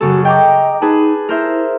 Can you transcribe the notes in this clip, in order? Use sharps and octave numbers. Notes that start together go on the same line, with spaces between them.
F#2 C#3 F#4 A4
D#5 G5 A#5 D6
D#4 G#4 B4 A5
E4 A#4 C5 E5